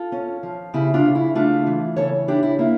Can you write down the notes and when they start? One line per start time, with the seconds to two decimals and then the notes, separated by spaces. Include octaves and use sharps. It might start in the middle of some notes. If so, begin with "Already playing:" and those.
Already playing: F4 A4
0.12 C#4
0.43 F3
0.74 C#3 E4 G4
0.94 D4 F4
1.05 C#3
1.15 E4
1.35 A3 D4 F4
1.67 E3
1.96 C#3 A4 C#5
2.28 D4 E4 G4
2.43 E4
2.59 A#3 E4